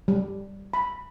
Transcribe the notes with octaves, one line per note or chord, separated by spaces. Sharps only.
G3
B5